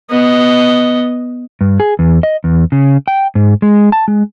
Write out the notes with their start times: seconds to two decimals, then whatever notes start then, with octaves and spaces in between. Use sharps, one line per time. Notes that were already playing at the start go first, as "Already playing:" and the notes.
0.10 B3 D#5
1.61 G2
1.80 G#4
1.99 E2
2.23 D#5
2.44 E2
2.72 C#3
3.08 G5
3.35 G#2
3.62 G#3
3.92 A5
4.08 G#3